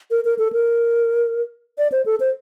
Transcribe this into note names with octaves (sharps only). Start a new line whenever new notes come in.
A#4
A#4
A4
A#4
D5
C5
A4
C5